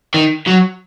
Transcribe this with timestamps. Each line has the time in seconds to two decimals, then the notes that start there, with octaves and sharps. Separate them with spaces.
0.14 D#3
0.47 F#3